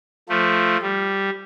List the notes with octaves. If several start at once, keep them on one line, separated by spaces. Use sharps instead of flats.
F3 A3
G3